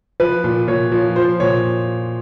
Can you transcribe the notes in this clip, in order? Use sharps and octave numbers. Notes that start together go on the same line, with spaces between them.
F3 B4
A#2
A#2 C#5
F3 C#5
F3 C5
A#2 C#5